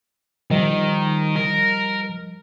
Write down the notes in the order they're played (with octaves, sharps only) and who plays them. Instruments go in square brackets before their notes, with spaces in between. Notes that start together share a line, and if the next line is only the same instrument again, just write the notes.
[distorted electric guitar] D#3 [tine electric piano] F3 G3 D#5
[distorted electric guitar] A#4